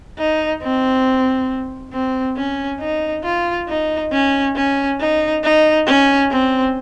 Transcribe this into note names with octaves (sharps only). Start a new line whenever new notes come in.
D#4
C4
C4
C#4
D#4
F4
D#4
C#4
C#4
D#4
D#4
C#4
C4